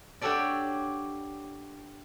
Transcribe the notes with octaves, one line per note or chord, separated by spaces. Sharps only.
D4 F#4 G4 A4 C#5 D5